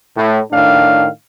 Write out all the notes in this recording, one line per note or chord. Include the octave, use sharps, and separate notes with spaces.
A2
A2 D#3 D4 F5